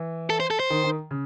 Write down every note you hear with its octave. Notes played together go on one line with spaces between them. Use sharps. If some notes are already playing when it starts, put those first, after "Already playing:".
Already playing: E3
A4
C5
A4
C5
D#3
D#3
C#3